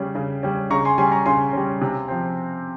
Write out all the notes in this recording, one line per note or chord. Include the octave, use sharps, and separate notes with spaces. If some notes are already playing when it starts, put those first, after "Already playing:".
Already playing: C#3 G3 C#4
C#3
G3 C#4
C#3 A#5 C#6
G#5 C6
G3 C#4 G#5 C6
A#5 C#6
C#3 G#5 C6
G3 C#4
C3
F3 C4